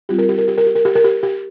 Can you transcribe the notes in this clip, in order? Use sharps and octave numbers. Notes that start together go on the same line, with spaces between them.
G3 C4 F4 G4
A#4
G4
A#4
G4
A#4
G4
A#4
G4
A#4
G4
G4